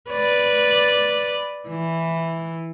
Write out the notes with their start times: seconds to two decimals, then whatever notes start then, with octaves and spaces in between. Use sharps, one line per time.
0.11 B4 D5
1.68 E3